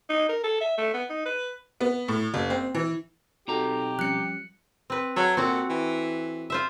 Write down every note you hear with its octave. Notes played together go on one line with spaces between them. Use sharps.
D#4
A#4
A4
E5
A3
B3
D#4
B4
B3
A2
F#1
C4
E3
B1 C4 D#4 F#4 G4 A4 A#5
F3 G3 C#4 F#6 C#7
C4 B4
F#3 A4 C#5
A#2 C4 F#4
E3
F4 C5 E5